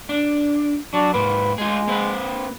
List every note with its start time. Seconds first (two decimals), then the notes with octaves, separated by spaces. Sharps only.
0.09 D4
0.94 F#3 D4
1.14 G#2 A#3 B4
1.58 G#3 F4 G#4
1.88 A#3 C4 B4